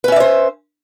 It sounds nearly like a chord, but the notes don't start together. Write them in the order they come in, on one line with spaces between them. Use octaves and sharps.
B4 C#4 E5 D5 C5